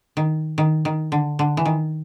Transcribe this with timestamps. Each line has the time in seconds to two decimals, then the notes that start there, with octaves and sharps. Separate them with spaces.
0.17 D#3
0.58 D#3
0.85 D#3
1.12 D3
1.39 D3
1.57 E3
1.65 D#3